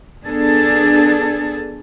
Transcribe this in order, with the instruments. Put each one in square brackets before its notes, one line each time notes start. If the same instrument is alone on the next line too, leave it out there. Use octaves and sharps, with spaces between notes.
[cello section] B3 D4 G#4 A4